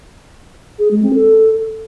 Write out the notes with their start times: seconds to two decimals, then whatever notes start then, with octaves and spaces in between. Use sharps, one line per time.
0.79 G#4
0.91 G#3
1.03 C4
1.15 A4